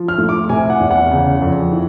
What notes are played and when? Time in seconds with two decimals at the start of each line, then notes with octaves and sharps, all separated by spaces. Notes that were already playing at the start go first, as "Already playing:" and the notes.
Already playing: F3
0.08 F6
0.18 A2
0.29 D6
0.49 C3 G#5
0.70 F#5
0.80 E2
0.91 F#5
1.11 C#3
1.41 F2
1.72 E3